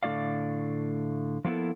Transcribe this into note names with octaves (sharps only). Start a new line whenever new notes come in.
A2 D3 A3 E4 D5 F5
F3 A#3 B3 E4 A4